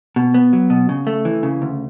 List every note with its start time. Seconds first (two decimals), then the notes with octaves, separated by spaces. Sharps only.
0.16 B2
0.34 B3
0.53 F#3
0.70 B2
0.89 C#3
1.07 A3
1.25 E3
1.43 C#3
1.62 D2